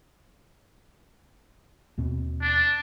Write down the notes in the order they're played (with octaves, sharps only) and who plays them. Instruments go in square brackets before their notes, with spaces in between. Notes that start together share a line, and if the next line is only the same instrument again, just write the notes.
[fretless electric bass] D#2 B2 C4
[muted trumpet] D4